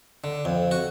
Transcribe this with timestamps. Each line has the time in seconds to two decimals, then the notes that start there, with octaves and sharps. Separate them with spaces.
0.24 D3
0.45 F2
0.71 F#4